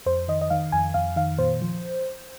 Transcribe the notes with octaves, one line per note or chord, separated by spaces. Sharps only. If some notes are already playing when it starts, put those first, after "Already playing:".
F2 C5
D#3 D#5
D#5
D#3 F5
F2 G#5
F2 F5
D#3 F5
A#2 C5
F3